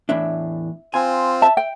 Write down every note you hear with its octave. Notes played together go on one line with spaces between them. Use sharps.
E2 A2 D4 E5
C4 F4 G#5
E5 A5
G5